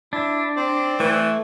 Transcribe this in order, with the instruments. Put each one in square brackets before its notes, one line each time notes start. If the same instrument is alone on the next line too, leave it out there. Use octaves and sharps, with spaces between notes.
[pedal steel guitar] D4 [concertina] E4
[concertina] C4 C5 D5
[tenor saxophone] E3 [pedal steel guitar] A3